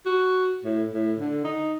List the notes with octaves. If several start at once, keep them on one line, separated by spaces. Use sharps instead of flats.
F#4
A2
A2
D3
D#4